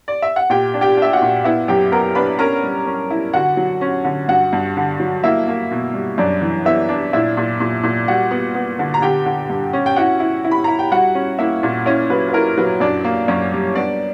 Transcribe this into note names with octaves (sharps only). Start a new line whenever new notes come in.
D5
E5
F#5
A#2 G4 G5
D4
G4 G5
D4
E5
F#4 F#5
A#2
B3 E4 E5
F#2 G4 G5
B3 A#4 A#5
D4 B4 B5
C#4 A#4 A#5
G3
C#4
E4
D3 F#4 F#5
F#3
C#4
D3
G2 F#4 F#5
G2
D3
F#3
A#3 E4 E5
A#3
B2
G3
F#2 D4 D5
E3
B3 E4 E5
D4
A#2 E4 E5
A#2
A#2
A#2
G3 F#4 F#5
B3
B3
D3
A#5
D3 G4 G5
D3
G2
C#4
G5
E4 F#4 F#5
E4
E4
B5
E4 A#5
G5
G3 F#4 F#5
C#4
A#3 E4 E5
A#2
C#4 E4 C#5
F#3 B4
B4
E4 A#4
F#3 B4
F#2 D4 D5
A#3
F#2 C#4 C#5
G3
B3 D4 D5